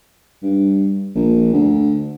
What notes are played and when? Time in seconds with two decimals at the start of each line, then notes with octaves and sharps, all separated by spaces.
0.43 G2
1.15 A#1
1.53 D2